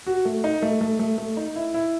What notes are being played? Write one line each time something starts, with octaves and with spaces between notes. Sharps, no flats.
F#4
A3
D#4
A3
A3
A3
A3
D#4
E4
E4